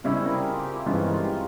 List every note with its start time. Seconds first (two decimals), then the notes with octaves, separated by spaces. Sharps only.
0.04 C#3 G3 C4 C#4 E4
0.25 A#4
0.32 G#4
0.53 F4
0.59 G4
0.75 E4
0.86 G2 E3 G#3 C#4 F4
1.13 F4